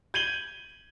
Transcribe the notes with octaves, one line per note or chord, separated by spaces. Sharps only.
G6 G#6 D#7 F#7 G7